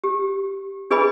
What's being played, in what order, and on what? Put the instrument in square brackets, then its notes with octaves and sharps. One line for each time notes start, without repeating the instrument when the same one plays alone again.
[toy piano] G4
D4 G#4 B4 D#5 G#5 B5